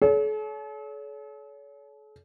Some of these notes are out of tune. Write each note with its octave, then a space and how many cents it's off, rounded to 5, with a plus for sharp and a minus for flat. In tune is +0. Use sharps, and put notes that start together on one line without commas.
A4 -45 C#5 +35